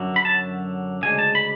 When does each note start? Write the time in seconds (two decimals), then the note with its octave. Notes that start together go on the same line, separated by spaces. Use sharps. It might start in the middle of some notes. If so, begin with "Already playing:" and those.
Already playing: F#2 D3 F#3
0.16 B5
0.25 A5
1.03 D2 C#3 G#3 D4 G#5
1.19 A5
1.35 B5